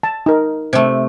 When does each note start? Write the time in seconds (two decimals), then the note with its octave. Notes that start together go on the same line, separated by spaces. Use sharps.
0.03 A5
0.26 D#4 A#4
0.73 C3 A3